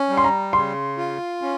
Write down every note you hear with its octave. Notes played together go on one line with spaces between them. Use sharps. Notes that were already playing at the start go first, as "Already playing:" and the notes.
Already playing: C#4
G3
C6
A#5
C#3 C6
F4
C#4